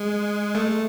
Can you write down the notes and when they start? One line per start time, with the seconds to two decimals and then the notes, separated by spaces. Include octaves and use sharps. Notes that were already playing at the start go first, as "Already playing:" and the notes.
Already playing: G#3
0.55 A3